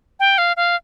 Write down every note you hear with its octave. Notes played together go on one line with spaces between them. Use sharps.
G5
F5
F5